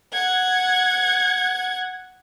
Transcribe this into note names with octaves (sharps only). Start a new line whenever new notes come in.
F#5 G#6